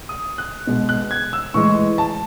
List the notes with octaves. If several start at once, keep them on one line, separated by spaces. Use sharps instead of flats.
D#6
F#6
B2 G#3
F#6
G#6
E6
A2 E3 G#3 C#6
A5